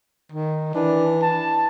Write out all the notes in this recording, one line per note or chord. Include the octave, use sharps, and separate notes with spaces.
D#3
E3 D4
A5